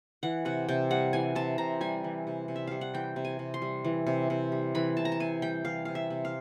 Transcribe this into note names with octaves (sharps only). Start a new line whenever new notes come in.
E3 F#5
C3 F#5
C3 G5
G3 F#5
E3 G#5
C3 A5
C3 A#5
G3 G#5
E3
C3
C3
E5
G3 F5
F#5
E3 G5
C3
G#5
C3
C6
G3
E3
C3
C3
G3
E3 B5
C3 A5
A#5
A5
C3 G#5
G3 G5
E3 F5
C3 F5
E5
C3
F5